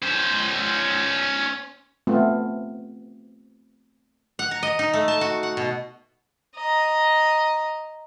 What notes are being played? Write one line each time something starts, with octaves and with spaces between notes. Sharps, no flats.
C#4 C5
A3 B3 C4 F4
F#5
A#5
D#5
D#4
A3
A5
F#4
F#5
B2
D#5 A#5